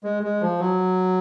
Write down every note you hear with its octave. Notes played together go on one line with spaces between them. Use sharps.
G#3
G#3
F3
F#3